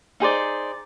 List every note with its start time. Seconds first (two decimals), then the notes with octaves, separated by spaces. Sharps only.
0.20 D#4 G#4 C5 D5